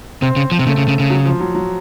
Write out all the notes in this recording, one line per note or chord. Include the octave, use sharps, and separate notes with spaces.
C3 C4
C#3
F3
C3
C#3 A3
C#3
C#3
C#3
F#3
F3
F#3
F#3